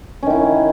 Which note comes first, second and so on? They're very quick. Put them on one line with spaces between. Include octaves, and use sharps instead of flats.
C#4 D#3 E4